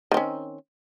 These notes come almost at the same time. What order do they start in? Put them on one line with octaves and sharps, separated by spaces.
D#3 C4 C#4